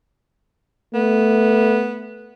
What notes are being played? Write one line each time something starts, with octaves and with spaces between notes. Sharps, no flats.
A3 B3